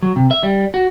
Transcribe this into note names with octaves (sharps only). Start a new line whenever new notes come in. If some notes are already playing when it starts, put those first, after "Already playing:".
F#3
C3
E5
G3
F#4